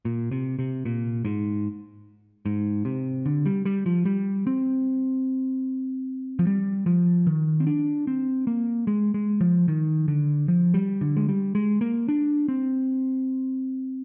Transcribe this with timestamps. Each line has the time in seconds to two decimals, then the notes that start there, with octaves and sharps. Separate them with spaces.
0.05 A#2
0.31 C3
0.59 C3
0.85 A#2
1.25 G#2
2.46 G#2
2.85 C3
3.26 D3
3.45 G3
3.65 G3
3.86 F3
4.05 G3
4.47 C4
6.39 F3
6.47 G3
6.86 F3
7.27 D#3
7.60 C4
7.67 D4
8.07 C4
8.47 A#3
8.87 G#3
9.14 G#3
9.41 F3
9.68 D#3
10.08 D3
10.48 F3
10.74 G3
11.01 D3
11.17 G#3
11.28 G3
11.55 G#3
11.81 A#3
12.08 D4
12.48 C4